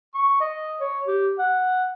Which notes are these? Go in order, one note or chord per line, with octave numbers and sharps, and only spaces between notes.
C#6
D#5
C#5
G4
F#5